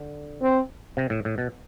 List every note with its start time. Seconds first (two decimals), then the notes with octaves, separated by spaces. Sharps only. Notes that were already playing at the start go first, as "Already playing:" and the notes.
Already playing: D3
0.42 C4
0.97 C3
1.10 A2
1.25 A2
1.38 B2